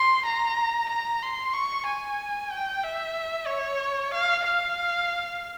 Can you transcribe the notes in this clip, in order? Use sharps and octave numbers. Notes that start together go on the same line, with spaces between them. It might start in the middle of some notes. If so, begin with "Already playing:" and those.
Already playing: C6
A#5
A#5
C6
C#6
G#5
G5
E5
C#5
F5
F5